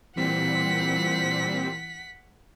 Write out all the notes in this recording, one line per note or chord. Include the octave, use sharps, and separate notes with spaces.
A#2 E3 G3 C4 F#5 B6